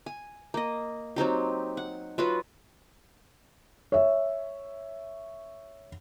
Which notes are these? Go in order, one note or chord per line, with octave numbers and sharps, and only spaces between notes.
G#5
A#3 D#5
F#3 C4 D#4 G4
F#5
F#3 F4 F#4 B4
C#5 E5